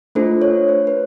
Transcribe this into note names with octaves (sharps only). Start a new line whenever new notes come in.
A3 D4 F4 A4 C5
C#5
C5
B4